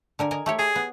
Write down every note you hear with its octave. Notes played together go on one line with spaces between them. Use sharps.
D3 A#4 G#5
A#4 D#5 G#5
A3 G4 C#5
G#4 A#5
B3